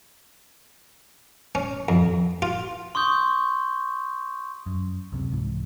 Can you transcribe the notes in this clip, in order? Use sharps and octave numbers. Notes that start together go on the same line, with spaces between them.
C#4
F2
F4
C6 C#6 D#6 G6
F#2
C#2 F#2 C3
C2 G#2 E3